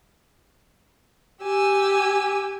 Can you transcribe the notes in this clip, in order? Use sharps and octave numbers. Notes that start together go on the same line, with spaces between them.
G4 G#5 E6